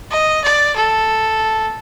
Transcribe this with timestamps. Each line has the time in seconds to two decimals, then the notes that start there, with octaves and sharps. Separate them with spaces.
0.11 D#5
0.44 D5
0.76 A4